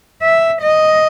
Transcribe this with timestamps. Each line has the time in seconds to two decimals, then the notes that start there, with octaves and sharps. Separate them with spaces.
0.23 E5
0.62 D#5